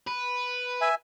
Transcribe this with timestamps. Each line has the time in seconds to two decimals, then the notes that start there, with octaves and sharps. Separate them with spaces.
0.07 B4
0.81 E5 G#5